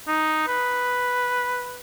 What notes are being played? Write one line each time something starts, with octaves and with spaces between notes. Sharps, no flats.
D#4
B4